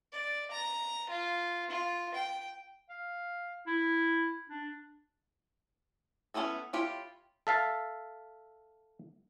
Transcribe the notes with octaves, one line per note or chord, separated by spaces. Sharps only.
D5
A#5
F4
F4
G5
F5
E4
D4
B3 C#4 E4 G#4 A4
E4 F4 G4 C#5
A4 E5 F5 A5